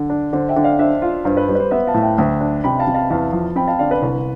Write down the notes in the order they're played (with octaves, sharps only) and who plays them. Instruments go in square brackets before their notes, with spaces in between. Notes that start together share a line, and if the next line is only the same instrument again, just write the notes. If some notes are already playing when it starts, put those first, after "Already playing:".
Already playing: [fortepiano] D3
D4
[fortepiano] D3 [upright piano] C5
[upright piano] E5 G5
[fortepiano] D3
[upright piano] D5 F5
[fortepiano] D4 [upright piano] C5 E5
[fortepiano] F4
[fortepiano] G2 [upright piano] C5
[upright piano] B4
[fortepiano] G3 [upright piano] C5
[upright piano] B4
C5
[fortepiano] B3 [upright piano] C5 E5
[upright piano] F5 A5
[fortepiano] A2
[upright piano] E5 G5
[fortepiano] D2
D4
[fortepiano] C3 [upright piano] G5 B5
[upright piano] F5 A5
[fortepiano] C3
[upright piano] F5 A5
[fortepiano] E2 [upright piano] F5 A5
[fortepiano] F3
[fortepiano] C4 [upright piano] G5 B5
[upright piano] F5 A5
[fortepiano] D3 [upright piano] D5 F5
[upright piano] B4 D5
[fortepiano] C2 [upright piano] B4